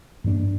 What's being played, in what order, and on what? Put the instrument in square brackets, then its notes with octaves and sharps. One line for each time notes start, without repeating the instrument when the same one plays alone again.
[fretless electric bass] G2 F3 A#3 D4